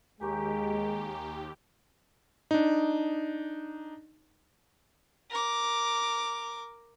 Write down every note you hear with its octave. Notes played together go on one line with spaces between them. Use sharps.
D#2 G#3 G4 G#5 A#5 C#6
D4 D#4
A#4 D6